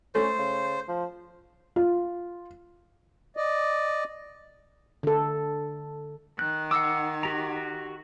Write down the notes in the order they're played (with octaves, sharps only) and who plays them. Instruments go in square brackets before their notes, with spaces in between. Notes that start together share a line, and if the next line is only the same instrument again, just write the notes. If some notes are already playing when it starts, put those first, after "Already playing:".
[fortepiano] A3 [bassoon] C#4 [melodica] C5
[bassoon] C#3
F3
[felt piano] F4
[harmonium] D5 D#5
[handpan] D3 A4
[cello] D#3 [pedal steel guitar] F#6
[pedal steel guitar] F#5 D6 [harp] E6 C7
[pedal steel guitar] F#4 G4 A#5